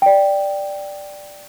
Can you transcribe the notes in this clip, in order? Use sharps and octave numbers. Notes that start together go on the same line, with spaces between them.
D5 G5